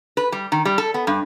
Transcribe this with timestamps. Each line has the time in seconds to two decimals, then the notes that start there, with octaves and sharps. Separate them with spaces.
0.17 B4
0.32 G3
0.52 D#3
0.65 G3
0.78 A4
0.94 B3
1.07 G2